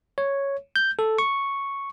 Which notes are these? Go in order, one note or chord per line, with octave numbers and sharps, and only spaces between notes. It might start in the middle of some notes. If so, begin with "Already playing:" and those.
C#5
G6
A4
C#6